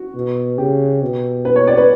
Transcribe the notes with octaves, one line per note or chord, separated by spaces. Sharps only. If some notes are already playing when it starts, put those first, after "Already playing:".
Already playing: F#4
B2
C#3 G4
B2
B4
C#5
D5
B4